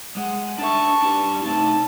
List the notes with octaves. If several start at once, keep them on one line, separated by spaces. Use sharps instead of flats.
G#3 F#5
D4 E5 A5 C#6
D4 G4
A3 C4 D#4 A5